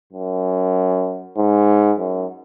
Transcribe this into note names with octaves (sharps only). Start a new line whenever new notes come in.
F#2
G#2
F#2